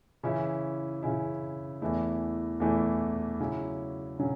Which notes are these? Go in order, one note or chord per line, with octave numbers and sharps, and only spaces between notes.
C#3 E3 C#4 E4
C#3 E3 C#4 E4
E2 E3 A3 E4
E2 E3 A3 E4
C#3 F#3 C#4 E4
C#3 F#3 C#4